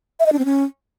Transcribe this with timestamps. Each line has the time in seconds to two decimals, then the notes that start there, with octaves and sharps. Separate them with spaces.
0.20 E5
0.26 D#5
0.32 D4
0.39 C4
0.45 C#4